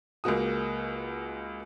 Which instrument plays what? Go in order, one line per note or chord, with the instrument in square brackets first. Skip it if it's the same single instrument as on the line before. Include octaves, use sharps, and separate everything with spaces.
[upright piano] C#2 G#3 A#3 F#4 D#6